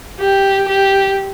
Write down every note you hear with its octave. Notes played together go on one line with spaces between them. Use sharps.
G4
G4